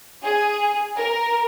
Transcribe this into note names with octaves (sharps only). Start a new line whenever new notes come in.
G#4
A#4